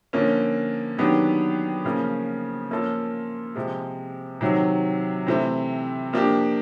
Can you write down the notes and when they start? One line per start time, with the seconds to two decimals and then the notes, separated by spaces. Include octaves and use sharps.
0.13 D3 F3 A#3 C#4
0.98 D#3 F#3 B3 D4 G4
1.85 C#3 F3 A#3 C#4
2.70 F3 A#3 C#4 F4 A4
3.55 C3 F3 G#3
4.41 C3 D#3 F#3
5.27 C3 E3 A3 C4
6.13 F3 A#3 D4 G4